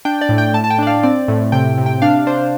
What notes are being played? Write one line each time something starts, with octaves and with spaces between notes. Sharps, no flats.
D4 G5
D5
A2
G5
A2 A5
A5
G5
D4 D5
F5
C4 D5
A2
C3 G5
C3
G5
D4 F5
D4 C5